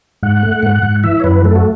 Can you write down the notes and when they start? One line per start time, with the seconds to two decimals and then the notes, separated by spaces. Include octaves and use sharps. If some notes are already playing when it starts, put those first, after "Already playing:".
0.23 G#2 F#5
0.43 A3
0.63 G#2
0.83 G#2
1.04 E3 E5
1.20 C#5
1.24 F#2 B4
1.44 A3 A4
1.56 F#4